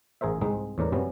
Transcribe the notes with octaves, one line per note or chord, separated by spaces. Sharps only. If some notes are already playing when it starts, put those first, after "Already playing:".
A1 G#4 A#4 C5 E5
C2 G#2 G#3 C4 D#4
E2 A2 D4 A#4
F#2 C3 G3 B3 C#4